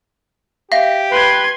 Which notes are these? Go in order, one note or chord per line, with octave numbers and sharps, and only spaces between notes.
G4 E5 F5 A#6
B4 C6 G#6